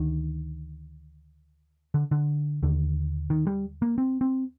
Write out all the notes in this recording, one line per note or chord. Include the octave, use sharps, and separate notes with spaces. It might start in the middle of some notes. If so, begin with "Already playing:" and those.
Already playing: D2 D3 D#3
D3
D3
D#2 D3
D#3
G3
A#3
C4
C4